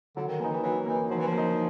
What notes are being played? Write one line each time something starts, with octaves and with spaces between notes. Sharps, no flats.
D3 F#3
D#3
E3 A#3 D#4
E3
E3 F#3
E3 A#3 D#4
F3 F#3
E3
F3
A#3 D#4